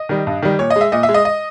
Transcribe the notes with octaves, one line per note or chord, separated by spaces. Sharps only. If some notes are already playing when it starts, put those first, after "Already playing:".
Already playing: D#5
D#3 G3
G2
D#3 G3
A#2 C#5
D#5
G#3
E5
A#2 D#5
E5
G#3
D#5
D#5